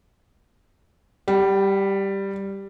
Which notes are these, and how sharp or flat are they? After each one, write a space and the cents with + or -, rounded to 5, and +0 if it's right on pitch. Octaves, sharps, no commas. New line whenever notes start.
G3 +0 G5 -45